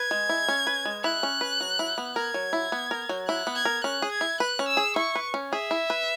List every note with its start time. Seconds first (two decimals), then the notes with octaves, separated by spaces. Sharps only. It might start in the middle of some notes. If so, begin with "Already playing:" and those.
Already playing: B4 G#6
0.11 G#3
0.29 E4
0.48 C#4
0.67 B4
0.85 G#3
1.04 E4 F#6
1.23 C#4
1.41 B4
1.61 F#3
1.79 E4
1.98 B3
2.16 A#4 G#6
2.34 F#3
2.53 E4
2.72 B3
2.91 A#4
3.09 F#3
3.28 E4 F#6
3.47 B3
3.56 G#6
3.65 A#4
3.84 C#4 F#6
4.02 G#4
4.12 G#6
4.21 E4
4.40 B4 F#6
4.59 C#4
4.68 E6
4.77 G#4
4.96 E4 C#6
5.15 B4
5.34 C#4
5.52 G#4 E5
5.71 E4
5.90 B4